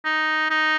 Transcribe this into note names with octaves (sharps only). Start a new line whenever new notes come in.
D#4
D#4